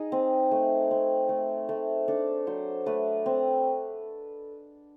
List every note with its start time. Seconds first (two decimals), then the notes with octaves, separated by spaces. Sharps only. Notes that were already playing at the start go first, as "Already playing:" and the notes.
Already playing: D#4 G#4
0.12 C4
0.51 A3
0.91 C4
1.29 A3
1.69 A3
2.08 D4 A4
2.47 F#3 C5
2.86 A3 B4
3.26 C4